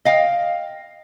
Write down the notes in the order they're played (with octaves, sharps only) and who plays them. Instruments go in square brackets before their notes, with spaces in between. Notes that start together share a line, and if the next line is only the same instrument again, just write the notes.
[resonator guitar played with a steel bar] D#5 F5 G5